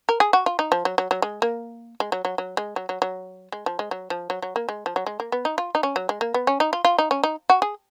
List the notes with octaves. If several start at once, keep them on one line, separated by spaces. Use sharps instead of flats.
A#4
G#4
F#4
F4
D#4
F3
F#3
F#3
F#3
G#3
A#3
G#3
F#3
F#3
F#3
G#3
F#3
F#3
F#3
G#3
F3
G#3
F#3
F3
F#3
F#3
A#3
G#3
F3
F#3
G#3
A#3
B3
D#4
F4
D#4
C#4
F#3
G#3
A#3
B3
C#4
D#4
F4
F4
D#4
C#4
D#4
F#4
G#4